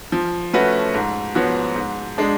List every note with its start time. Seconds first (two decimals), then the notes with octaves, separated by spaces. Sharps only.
0.12 F3
0.53 A3 C#4 F#4 B4
0.94 G#2
1.35 F3 B3 F#4 C#5
1.76 G#2
2.18 G#3 D4